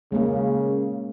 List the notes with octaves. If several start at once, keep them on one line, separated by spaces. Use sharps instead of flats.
C#3 G#3 A#3